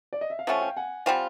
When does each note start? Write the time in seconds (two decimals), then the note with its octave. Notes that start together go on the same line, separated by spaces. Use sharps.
0.13 D5
0.21 D#5
0.30 E5
0.39 F5
0.47 F3 A3 C#4 E5 F#5
0.62 F5 G5
0.77 F#5 G#5
1.06 G3 C4 F4 F#5 G#5